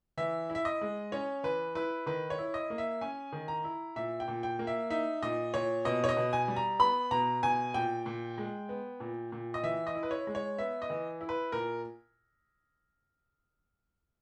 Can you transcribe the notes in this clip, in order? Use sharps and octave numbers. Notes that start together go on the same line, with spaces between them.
E3 E5
E4
E5
D#5
G#3
C#4 C#5
E3 B4
E4 B4
D#3 B4
C#5
E4
D#5
A#3
E5
C#4 G#5
D#3
A#5
E4
A#2 E5
G5
A#2
G5
A#3
E5
D#4 E5
A#2 D#5
A#2 C#5
B2 D#5
C#5
D#5
B2
G#5
G3
A#5
B3 B5
B2 A#5
B2 G#5
A#2 G5
A#2
G#3
B3
A#2
A#2
D#5
E3 E5
D#5
E4
B4
C#5
G#3
C#5
B3 E5
D#5
E3
E4
B4
A#2 A#4